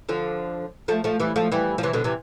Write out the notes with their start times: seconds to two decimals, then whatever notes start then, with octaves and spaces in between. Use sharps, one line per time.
0.09 D3 F3
0.88 F3 A3
1.04 F3 A3
1.20 E3 G3
1.36 F3 A3
1.52 E3 G3
1.78 F3
1.83 C3 E3
1.93 B2 D3
2.04 C3 E3